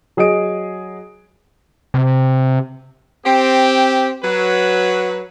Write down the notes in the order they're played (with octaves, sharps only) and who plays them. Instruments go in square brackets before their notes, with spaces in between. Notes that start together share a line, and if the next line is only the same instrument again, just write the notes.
[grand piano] F#3 G#4 D#5 D#6 D7
[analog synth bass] C3
[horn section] C4 G4
F#3 B4